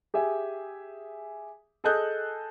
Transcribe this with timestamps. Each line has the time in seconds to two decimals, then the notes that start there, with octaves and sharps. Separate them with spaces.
0.14 G4 G#4 E5 G#5
1.84 G#4 A4 D#5 D#6 F#6 G6